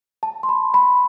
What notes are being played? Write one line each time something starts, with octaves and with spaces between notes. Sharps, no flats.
A5
C6
B5
B5